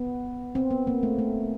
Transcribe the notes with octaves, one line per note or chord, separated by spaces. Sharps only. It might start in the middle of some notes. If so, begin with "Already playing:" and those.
Already playing: B3
C4
B3
A#3
A3
A3